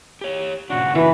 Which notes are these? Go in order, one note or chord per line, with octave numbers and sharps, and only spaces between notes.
G4 C#5
A#2 C#3 D4 F#4
E3 B4